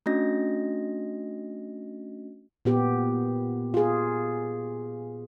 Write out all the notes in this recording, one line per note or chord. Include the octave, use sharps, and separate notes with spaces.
A3 C#4 D4 F#4 D#5 A#6
A#2 B3 G4
F4 G#4